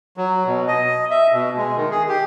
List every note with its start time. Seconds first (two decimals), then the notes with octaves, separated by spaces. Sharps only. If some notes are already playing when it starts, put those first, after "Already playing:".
0.17 F#3
0.46 B2
0.68 D#5
1.11 E5
1.33 B2
1.57 G#3
1.76 D#3
1.91 G#4
2.09 G4